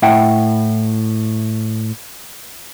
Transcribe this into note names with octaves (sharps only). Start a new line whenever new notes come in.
A2 E4 E5 F#5 G5